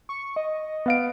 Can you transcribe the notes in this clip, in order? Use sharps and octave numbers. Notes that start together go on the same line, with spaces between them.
C#6
D#5
B3 F5 D7